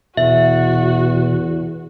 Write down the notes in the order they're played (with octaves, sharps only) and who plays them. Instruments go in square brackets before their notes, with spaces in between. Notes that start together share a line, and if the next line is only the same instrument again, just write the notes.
[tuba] E2 [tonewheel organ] B2 [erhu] F#4 [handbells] E5